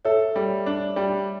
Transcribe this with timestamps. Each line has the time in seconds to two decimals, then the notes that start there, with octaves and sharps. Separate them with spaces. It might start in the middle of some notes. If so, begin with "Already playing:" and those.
0.05 A4 C#5 E5
0.36 G3
0.66 D4
0.96 G3